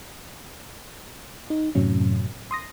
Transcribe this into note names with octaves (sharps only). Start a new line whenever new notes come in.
D#4
F#2 A2 C3 F#3 C#4
C6 D#6 A#6